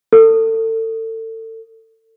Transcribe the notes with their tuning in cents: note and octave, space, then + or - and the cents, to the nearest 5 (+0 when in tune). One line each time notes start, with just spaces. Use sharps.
A4 +30